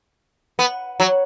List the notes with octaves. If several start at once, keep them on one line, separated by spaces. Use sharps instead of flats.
B3
F#3